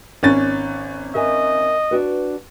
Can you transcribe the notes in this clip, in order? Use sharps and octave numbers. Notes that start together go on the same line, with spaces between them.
G#1 C#4 A6
A#4 D#5 E5 G#5
D4 F#4 B4